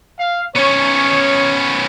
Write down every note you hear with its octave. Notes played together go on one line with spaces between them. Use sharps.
F5
B3 C#4 C#5